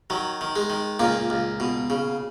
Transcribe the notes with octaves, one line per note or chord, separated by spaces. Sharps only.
D#3 F#3
D#3
G#3
D#3
C#2 A#2 A#3
C#2
B2
C#3